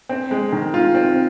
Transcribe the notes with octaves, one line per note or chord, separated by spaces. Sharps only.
C4
G#3
D#3
F4
C4